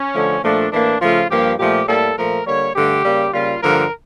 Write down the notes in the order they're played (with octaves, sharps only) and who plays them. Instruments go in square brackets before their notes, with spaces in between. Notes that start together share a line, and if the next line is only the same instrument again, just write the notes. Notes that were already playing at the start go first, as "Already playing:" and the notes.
Already playing: [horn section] C#4
D3 F3 A3
A#2 F3 A3 D4
A2 E3 A#3 D4
C#3 F3 A3 F4
G2 F3 A#3 G4
A#2 F3 A3 G4
A2 G3 A#3 A4
A#2 F3 A3 A#4
D3 G3 A#3 C#5
G2 D3 A3 G4
C#3 G3 A#3
C#3 G3 A#3 F4
G2 D3 F3 A#3 A#4